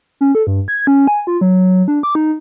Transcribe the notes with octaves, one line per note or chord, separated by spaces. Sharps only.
C#4
A4
G2
G#6
C#4
G#5
F4
F#3
D4
D6
D#4